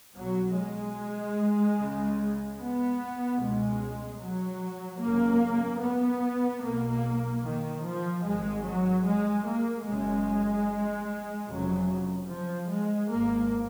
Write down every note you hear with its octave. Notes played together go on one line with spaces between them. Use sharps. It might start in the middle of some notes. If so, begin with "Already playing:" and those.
B1 B2 F#3
G#3
C#2 C#3
B3
C#2 B2 G#3
F#3
G#1 F#2 C#3 A#3
B3
B1 B2 A#3
D#3
F3
G#1 G#2 G#3
F#3
G#3
A#3
F#1 F#2 C#3 G#3
F1 F2 C#3 F#3
F3
G#3
G#1 G#2 A#3